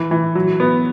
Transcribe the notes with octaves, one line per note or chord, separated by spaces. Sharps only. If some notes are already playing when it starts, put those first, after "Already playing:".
Already playing: E3
E3
F#3
B3